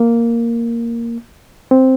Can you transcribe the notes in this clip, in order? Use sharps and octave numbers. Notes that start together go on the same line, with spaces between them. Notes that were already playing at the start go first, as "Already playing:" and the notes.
Already playing: A#3
C4